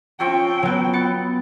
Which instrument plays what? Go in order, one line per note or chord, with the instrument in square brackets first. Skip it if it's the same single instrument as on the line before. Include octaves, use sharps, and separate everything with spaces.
[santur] F3 C4 C#6 [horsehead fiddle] C#4 G5
[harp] F#3 B3
[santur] B3 [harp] A6 C#7